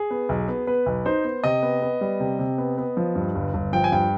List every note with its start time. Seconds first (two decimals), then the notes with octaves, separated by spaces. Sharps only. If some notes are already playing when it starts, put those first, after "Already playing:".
Already playing: G#4
0.10 B3
0.29 B1
0.48 B3
0.67 B3 B4
0.86 B1
1.06 D#4 C5
1.24 B3
1.44 C3 D#5
1.63 B3
1.82 B3
2.01 G3
2.20 C3
2.39 C3
2.58 B3
2.77 B3
2.97 F3
3.15 G2
3.35 G1
3.54 G1
3.73 F3 G5
3.84 G#5
3.92 G2 G5